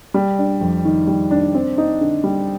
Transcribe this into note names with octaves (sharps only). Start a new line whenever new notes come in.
G3
D4
F2
D#3
G3
D4
C4
D#4
D3
G3